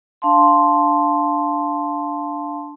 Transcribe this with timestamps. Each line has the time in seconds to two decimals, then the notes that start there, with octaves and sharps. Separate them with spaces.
0.22 D4 F5 A5 C6